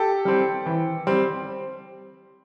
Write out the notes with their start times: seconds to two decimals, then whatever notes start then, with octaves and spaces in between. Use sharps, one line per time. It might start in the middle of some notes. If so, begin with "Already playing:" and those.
Already playing: G4 A4
0.25 G3 C4
0.66 E3
1.07 G3 C4